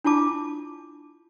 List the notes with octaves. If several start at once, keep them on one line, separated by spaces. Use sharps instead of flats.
D4 E4 F4 A5 D6